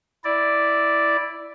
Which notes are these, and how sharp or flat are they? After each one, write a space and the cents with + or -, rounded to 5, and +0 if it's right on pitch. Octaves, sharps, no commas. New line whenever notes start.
E4 +0 D5 +0